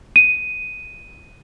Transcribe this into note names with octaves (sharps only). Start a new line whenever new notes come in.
D#7